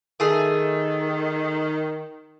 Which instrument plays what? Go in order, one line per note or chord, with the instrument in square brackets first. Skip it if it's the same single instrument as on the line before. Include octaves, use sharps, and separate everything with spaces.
[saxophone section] D#3 [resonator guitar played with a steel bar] A3 G#4